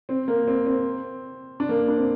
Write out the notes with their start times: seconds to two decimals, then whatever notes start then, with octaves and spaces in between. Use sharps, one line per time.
0.09 C4
0.28 A#3
0.47 C4
0.66 C4
1.60 D4
1.69 A#3
1.88 D4
1.97 C4